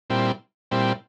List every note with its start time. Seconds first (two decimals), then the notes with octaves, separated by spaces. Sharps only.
0.10 A#2 G3 C4 E4
0.71 A#2 G3 C4 E4